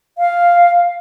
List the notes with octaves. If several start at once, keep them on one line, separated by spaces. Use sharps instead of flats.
F5